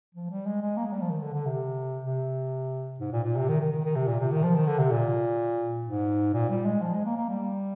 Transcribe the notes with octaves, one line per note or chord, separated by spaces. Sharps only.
F3
G3
G#3
G#3
A#3
G#3
G3
F3
D#3
D3
D3
C3
C3
G#2
A#2
A#2
C3
D#3
D#3
D#3
D#3
C3
A#2
C3
D#3
F3
D#3
D3
C3
A#2
G#2
A#2
G3
G#3
F3
G#3
A#3
A#3
G3